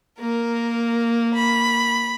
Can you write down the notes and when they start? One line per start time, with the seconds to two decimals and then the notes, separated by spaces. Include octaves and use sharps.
0.20 A#3 A#4
1.34 B5